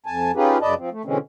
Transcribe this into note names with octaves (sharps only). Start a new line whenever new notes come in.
F2 G#5 A5
C#4 D#4 F4 G4 G#4 B4
F#2 C#3 B4 D5 D#5 A5
F3 C4
A3
B2 D3 E3 G#3 C4 C#4